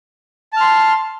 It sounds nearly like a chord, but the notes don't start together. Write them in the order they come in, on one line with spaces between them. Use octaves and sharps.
A5 F6 C6